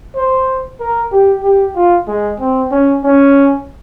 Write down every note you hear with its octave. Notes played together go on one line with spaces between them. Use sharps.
C5
A#4
G4
G4
F4
G#3
C4
C#4
C#4